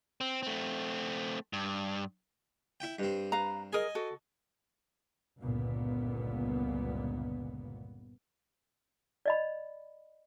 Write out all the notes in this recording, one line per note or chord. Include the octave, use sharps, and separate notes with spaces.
C4
A3 C4
G2
E4 G5
G2 C4
B4 F5 A#5
G#4 A#4 D#5 G#5
F#4 A4
G1 C#2 A#2 B3
D5 D#5 B5